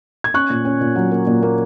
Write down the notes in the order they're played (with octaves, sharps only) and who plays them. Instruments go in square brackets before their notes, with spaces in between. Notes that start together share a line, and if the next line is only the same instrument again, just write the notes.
[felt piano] G#6
C#4 C#6 F#6
A#2
C#4
A#2
F#3
A#3
A#2
A#3